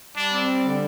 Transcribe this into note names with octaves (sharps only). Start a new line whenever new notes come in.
G3 D4
C4
G3
D3